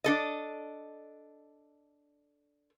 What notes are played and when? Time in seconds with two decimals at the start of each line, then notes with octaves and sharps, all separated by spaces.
0.04 D4 A4 D#5